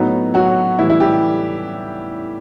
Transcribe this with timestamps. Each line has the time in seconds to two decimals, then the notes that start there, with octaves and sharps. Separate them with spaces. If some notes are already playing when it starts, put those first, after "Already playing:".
Already playing: A2 F#3 B3 D#4
0.34 F#3 F#4
0.79 A2 E3 G3 E4
0.90 E4
1.00 G3 G4